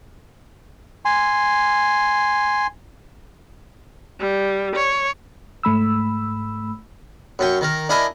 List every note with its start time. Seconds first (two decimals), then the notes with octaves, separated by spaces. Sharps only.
1.05 G#5 C6
4.19 G3
4.75 C#5
5.63 G#2 A3 B5 E6
7.39 F#2 C#4 G5
7.61 D#3 A#4
7.89 D4 E4 A#4 D#5 G#5